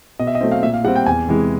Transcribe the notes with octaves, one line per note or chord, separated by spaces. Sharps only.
B2 D#5
E5
D#5
F#3 A3 C4
F5
A#2 E5
F5
G3 C4 F#5
G5
E2 G#5
C3 E3 G#3